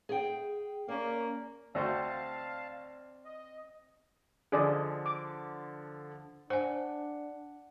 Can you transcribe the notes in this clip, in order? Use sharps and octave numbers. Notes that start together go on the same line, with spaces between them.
G#4 G5
A#3 C#4 D5
D2 C4 F#4 D5 D#5 F5 A5 G6
F6
D#5
D3 F3 G#4 D5 D#5
D6
D4 C5 F#5 G#5